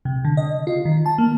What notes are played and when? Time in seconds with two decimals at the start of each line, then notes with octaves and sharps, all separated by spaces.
0.05 C3
0.25 D3
0.37 D#5
0.67 F4
0.85 D#3
1.06 A5
1.18 A#3